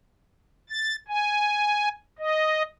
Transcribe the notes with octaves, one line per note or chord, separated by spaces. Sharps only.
A6
G#5
D#5